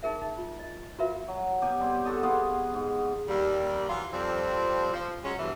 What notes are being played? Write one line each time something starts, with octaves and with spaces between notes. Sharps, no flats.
D#4 G#4 A#4 E5
D#4
F4
D#5
F4 F#4 A#4 B4 E5 F5
F#3
B2 G4 G#5
G3 C4
F#4 G4 A4 D#5
B3 F4 F#4 G#4
G#2
D#2 G3
E3 F#3 F4
F2 F3 G3 C4
F3
F#3 G#3 C#4
G2 B2 E3